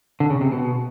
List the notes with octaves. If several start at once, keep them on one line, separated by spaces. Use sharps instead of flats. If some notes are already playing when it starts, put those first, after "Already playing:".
D3
C#3
C3
B2